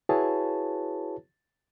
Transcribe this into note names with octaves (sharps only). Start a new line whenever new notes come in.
E4 F#4 G#4 B4 C#5 A5